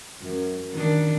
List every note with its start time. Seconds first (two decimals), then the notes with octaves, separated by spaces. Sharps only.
0.22 F#2
0.73 D#3 D4